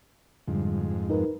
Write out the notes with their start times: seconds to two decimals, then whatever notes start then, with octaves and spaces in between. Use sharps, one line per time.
0.48 F2 G#2 D3 G3
1.09 D#4 A#4 B4